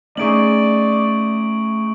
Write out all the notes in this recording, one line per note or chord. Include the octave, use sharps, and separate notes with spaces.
A3 C#4 D#4 G#4 D5 C#6 D7 F#7